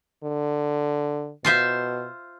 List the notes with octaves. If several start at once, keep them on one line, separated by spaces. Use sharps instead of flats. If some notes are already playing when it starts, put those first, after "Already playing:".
D3
B2 F4 C5 E5